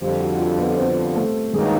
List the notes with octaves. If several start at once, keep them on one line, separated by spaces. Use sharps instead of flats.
F2 D3 F3 G3 G4
F#4
F4
B3 B4
C4 C5
A3 A4
G2 D#3 F#3 G#3 A#3 D#4 G#4